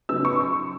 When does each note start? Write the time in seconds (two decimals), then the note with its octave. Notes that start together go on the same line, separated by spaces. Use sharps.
0.09 C#3 F#3 B3 D#4 E6
0.25 C#6
0.40 C#6